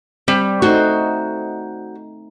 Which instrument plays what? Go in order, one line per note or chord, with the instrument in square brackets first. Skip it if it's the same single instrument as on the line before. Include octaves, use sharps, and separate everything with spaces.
[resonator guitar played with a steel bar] G3 [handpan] C4
[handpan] A3 D#4 [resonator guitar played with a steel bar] F#4 C5